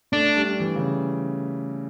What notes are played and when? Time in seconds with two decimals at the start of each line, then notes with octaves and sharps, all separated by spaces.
0.13 A3 D4
0.36 G3
0.60 E3
0.76 C#3